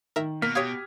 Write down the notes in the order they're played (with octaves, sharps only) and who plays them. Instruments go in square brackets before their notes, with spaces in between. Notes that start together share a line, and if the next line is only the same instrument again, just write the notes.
[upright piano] D#3 [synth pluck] A#4 E5
[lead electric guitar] B2 [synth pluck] A#3 [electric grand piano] F6 B6
[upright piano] G4 D#6 G#6 [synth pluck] C#5 F5